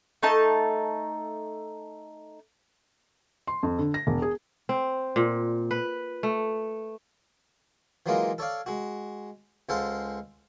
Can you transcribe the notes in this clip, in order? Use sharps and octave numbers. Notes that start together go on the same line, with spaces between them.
A3 D#4 A5
C6
F2
D3
A#6
E1
G#4
C4
A#2
B4
A3
E3 F#3 G#3 A#3 D#4 F4
A4 C#5 D5 F5
G#3 F#4
C#2 G#3 A4 C5 F5 F#5